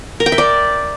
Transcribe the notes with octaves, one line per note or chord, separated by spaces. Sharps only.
A#4
G5
E5
D5